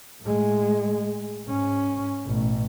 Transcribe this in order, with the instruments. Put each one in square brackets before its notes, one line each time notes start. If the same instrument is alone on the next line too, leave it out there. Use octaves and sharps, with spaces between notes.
[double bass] A2 G#3
G#2 C#4
A1 B2